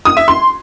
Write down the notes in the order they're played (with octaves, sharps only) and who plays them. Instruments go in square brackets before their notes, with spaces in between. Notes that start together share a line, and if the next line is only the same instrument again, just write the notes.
[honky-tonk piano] D#6
E5
C6